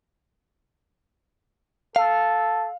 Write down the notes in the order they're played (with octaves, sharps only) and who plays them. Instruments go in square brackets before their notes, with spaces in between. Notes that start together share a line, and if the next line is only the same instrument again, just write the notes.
[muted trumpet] A4 [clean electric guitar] F5